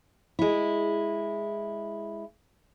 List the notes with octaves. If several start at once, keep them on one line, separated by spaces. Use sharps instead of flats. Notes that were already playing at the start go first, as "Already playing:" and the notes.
G#3 E4